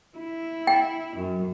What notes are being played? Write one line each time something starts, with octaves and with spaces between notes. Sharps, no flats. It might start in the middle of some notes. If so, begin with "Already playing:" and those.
E4
G5
F#2